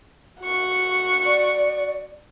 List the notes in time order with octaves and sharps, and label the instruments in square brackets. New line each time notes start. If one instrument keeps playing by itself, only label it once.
[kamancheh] F#4 C#6
[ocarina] D5